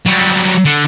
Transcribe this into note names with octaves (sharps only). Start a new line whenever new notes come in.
F#3 G3
D3